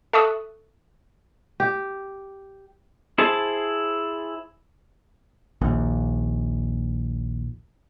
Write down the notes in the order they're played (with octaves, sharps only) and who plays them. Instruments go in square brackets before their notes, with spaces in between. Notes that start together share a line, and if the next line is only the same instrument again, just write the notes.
[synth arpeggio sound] A4 E5 A5 C#6 D#6 F#6
[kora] G4
[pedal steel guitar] E4 G#4 C5 A5
[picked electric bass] A#1 D#2